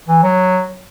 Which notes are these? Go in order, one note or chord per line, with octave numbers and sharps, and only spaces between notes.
E3
F#3